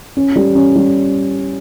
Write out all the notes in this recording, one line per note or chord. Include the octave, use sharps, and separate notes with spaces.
C#4
G3
C#4
G3